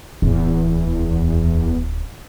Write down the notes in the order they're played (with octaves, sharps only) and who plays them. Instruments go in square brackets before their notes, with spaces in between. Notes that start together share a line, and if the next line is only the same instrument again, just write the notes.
[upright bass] D1 [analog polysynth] E2